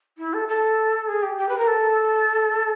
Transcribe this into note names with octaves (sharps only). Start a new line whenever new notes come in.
E4
A4
A4
G#4
G4
G4
B4
A#4
A4